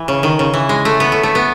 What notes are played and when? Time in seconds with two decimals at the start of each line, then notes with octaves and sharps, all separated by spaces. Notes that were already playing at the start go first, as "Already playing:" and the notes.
Already playing: E3
0.08 C#3
0.23 D#3
0.39 C#3
0.54 E3
0.69 G#3
0.85 A3
1.00 B3
1.12 A3
1.23 A3
1.35 B3